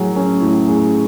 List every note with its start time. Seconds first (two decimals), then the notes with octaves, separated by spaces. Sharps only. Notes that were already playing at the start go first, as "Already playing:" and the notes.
Already playing: A2 F#3 G#4
0.16 C#4
0.41 A2
0.67 G#4